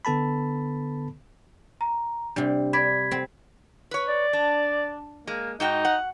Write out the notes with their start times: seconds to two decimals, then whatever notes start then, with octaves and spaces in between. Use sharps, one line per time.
0.05 D3 B3 A4 A5 B5
1.81 A#5
2.36 C3 G3 D4
2.73 D5 B5 G#6 B6
3.11 C4
3.91 B4 C#5
4.09 D5
4.33 D4
5.27 G#3 A#3
5.60 G#2 D#4 F#4 G5
5.85 F#5